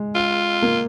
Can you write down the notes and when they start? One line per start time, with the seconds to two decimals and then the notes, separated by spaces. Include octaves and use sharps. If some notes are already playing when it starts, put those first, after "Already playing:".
Already playing: G#3
0.15 F4
0.62 A#3